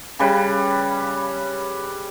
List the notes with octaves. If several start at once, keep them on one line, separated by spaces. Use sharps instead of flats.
C#3 G3 B4